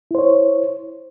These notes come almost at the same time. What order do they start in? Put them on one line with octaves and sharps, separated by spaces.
E4 C5 C#5